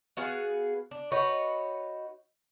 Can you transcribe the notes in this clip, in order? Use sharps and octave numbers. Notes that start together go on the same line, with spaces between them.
B3 F#4 G#4 F5
D4
D#4 F#4 B4 C#5